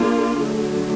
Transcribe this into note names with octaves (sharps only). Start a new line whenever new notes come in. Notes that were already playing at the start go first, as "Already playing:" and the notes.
Already playing: A#3 D4 F4 G#4
D3 F#3 A3